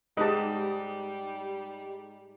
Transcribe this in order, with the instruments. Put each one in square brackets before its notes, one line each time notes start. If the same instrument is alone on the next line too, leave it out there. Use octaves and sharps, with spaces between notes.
[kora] G#2 B4 [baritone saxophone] G3 [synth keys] G#3 D#4 G4 [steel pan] D#5 A5